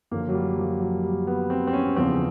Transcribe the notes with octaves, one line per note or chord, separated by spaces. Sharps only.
F#2 D3 F3 A#3
F#3
G3
F3
F#3
G3
B3
C4
C4
C#4
E2 C#3 F3 C4